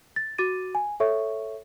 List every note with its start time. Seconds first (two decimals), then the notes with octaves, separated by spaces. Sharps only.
0.16 A6
0.38 F#4 D6 A6 D#7
0.75 G#5
1.00 A4 C#5 E5 C#6